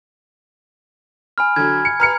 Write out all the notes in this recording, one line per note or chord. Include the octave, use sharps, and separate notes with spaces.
G#5 B5 F6
D3 F#3 G#6
C#7
B4 A#5 F6 C#7